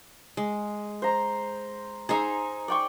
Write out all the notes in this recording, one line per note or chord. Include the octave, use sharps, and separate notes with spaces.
G#3
C5 A#5
D#4 G#4 C5 G#5 A#5 E6
D5 G5 C#6